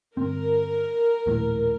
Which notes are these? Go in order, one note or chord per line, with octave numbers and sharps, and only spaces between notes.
G1 C4 A#4
A#1 D#2 A2